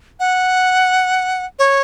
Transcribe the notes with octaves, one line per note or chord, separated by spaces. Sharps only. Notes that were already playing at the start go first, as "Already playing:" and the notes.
F#5
C#5